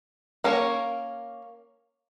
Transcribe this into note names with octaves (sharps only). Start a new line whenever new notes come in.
A#3 C#4 A#4 C#5